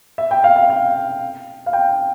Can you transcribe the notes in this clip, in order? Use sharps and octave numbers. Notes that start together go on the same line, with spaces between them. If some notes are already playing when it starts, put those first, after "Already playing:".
E5
G5
F5
F5
F5
F5
G5